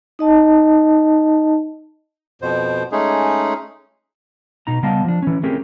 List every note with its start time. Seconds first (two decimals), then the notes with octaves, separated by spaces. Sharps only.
0.19 D#4 D#5 A5
2.42 F2 B2 C5
2.92 G#3 A3 C#4 D#4 G#4
4.67 B2 D#4 A#5
4.83 C#3 G3 B3 D#5 F5 A5
5.04 F3 D4
5.23 E3 C#4
5.43 A3 C4 C#4 G4 G#4 A#4